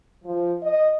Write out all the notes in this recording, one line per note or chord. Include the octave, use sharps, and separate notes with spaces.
F3
D#5